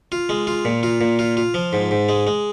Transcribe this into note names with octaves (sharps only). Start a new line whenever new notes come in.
F4
G#3
F4
A#2
F4
A#2
F4
F4
F3
G#2
G#2
G#3
G#3